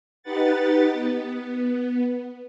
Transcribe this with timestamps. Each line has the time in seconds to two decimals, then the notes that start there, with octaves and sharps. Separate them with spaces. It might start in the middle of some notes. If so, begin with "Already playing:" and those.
0.23 D#4 G4 B4 F#5 A6
0.92 B3